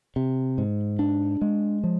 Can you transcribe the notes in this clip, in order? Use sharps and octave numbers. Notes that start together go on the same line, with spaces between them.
C3
G#2
D4
G#3
F3